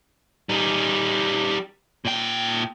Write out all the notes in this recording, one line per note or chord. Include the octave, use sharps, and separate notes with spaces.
G3 D#4
A#2 G5